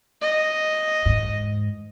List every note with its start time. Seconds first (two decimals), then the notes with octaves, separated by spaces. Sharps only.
0.21 D#5
1.05 E2 G#2